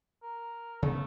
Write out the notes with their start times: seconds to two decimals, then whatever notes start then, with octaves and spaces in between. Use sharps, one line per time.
0.23 A#4
0.82 C#3 A3 B3